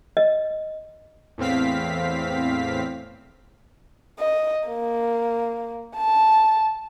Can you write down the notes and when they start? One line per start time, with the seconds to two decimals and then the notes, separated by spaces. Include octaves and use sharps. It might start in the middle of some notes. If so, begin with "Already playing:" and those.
0.17 D#5
1.38 E2 A2 C4 F5 B6
4.19 D#5
4.68 A#3
5.97 A5